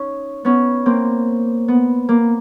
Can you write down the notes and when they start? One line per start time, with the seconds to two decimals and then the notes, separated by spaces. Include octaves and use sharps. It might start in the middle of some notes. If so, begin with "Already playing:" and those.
Already playing: C#4 D#4
0.45 B3 C#4
0.86 A#3 C4
1.68 B3
2.09 A#3